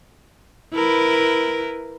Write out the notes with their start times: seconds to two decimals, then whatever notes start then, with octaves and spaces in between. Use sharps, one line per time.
0.74 E4 A#4 B4